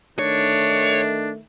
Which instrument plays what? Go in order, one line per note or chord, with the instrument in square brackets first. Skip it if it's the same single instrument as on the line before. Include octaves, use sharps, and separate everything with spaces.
[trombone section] D#3 A3 [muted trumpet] D4 [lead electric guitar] C#5